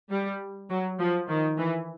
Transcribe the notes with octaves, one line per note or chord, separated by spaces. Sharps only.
G3
F#3
F3
D#3
E3